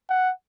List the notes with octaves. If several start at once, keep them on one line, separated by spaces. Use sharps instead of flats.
F#5